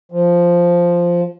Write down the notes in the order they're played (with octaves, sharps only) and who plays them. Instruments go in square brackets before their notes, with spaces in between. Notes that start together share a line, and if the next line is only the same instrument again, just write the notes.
[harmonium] F3